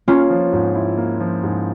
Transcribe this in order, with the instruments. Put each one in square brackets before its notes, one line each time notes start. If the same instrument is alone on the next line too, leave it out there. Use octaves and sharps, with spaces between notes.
[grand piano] A#3 [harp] C#4 F4
[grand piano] F3
G#2
E4
A#3
F3
G#2